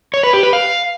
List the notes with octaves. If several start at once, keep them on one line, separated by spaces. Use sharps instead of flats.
C#5
B4
G4
B4
F5